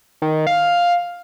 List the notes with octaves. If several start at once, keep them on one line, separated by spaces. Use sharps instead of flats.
D#3
F5